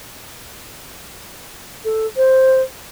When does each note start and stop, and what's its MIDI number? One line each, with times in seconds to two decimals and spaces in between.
1.84 2.06 69
2.16 2.62 72